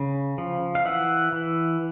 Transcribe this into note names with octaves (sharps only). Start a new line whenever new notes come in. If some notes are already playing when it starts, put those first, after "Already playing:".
Already playing: C#3
F3
F5
E3 E5 F#5
E3